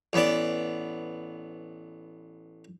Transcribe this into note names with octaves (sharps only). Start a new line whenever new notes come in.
A1 B3 D5